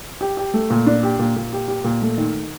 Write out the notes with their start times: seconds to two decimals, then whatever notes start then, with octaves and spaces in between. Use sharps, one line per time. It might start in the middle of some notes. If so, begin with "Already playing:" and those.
0.21 G4
0.37 G4
0.54 A3
0.70 A#2
0.86 D4
1.03 G4
1.19 A#2
1.36 A#2
1.53 G4
1.68 G4
1.84 A#2
2.02 A3
2.17 D#3